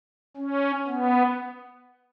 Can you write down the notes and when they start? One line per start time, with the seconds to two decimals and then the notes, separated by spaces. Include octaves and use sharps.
0.37 C#4
0.87 B3